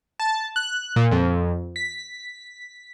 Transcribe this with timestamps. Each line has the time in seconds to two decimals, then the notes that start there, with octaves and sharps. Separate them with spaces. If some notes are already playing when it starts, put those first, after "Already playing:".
0.20 A5
0.56 F#6
0.96 A#2
1.11 F2
1.76 B6